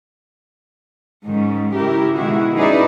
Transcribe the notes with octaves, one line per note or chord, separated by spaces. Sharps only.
G#2 D#3 C#4
C#3 E4 G4 A#4
B2 D#3 G#3 E4 F#4 G#4
C#4 D#4 E4 G#4 B4 D5